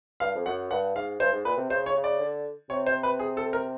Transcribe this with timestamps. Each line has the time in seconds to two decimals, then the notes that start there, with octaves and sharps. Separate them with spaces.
0.20 G2 F5
0.35 F2
0.46 F#2 F#5
0.71 G2 F#5
0.95 G#2 F5
1.20 G2 C5
1.33 G#2
1.45 A#2 B4
1.57 C3
1.70 C#3 C5
1.86 C#5
1.95 C#3
2.04 D5
2.20 D3
2.70 C3 C#5
2.86 C5
3.03 B4
3.19 G#4
3.37 A4
3.53 A#4